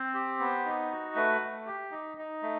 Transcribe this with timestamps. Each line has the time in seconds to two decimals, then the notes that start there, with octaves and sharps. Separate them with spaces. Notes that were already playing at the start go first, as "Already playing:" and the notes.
Already playing: C4 C5
0.14 G4
0.40 B3
0.65 D#4
0.91 F#4
1.15 A3 B4
1.41 A3
1.66 G4
1.91 D#4
2.18 D#4
2.43 A3